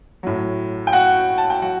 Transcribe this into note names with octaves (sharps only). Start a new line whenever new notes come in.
A2 F#3
G5
F#4 F#5
A5
G5
F#3 F#4 F#5